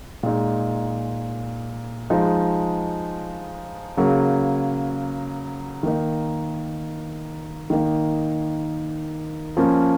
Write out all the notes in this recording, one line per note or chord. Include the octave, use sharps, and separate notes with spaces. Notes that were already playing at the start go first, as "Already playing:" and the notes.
A#2 G#3 D#4
F3 G#3 D#4
C#3 F#3 A#3
D#3 A#3 D#4
D#3 A#3 D#4
F3 A#3 C#4